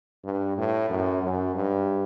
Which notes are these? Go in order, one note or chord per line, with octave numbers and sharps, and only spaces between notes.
G2
A2
F#2
F#2
G2